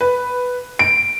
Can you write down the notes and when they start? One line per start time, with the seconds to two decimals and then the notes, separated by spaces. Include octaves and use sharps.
0.01 B4
0.79 D7